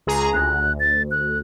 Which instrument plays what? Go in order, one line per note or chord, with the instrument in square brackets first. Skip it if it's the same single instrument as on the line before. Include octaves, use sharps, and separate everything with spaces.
[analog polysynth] C#2 G#4 A#5
[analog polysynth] D2 [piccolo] F#6
[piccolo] A6
F#6